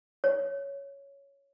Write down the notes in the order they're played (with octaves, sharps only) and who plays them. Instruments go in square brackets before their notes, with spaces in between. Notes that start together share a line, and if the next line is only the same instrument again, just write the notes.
[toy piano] C#5